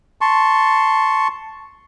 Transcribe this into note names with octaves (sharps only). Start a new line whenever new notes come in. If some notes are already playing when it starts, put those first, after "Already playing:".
A5 C6 C#6